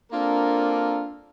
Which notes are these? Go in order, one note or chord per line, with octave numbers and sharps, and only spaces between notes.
A#3 C4 D4 F4 A4 A#4